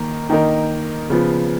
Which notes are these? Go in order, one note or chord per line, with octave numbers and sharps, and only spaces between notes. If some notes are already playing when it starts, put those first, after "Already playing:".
Already playing: D#3 A#3 A#4
D#3 A#3 D#4 A#4
C#3 F3 B3